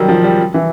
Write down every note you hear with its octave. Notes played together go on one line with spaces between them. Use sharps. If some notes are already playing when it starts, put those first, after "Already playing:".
Already playing: D#3 F#3 G3
F3
G3
E3